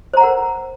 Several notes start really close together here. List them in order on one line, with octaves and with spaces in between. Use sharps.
C5 A#5 F#5 A#4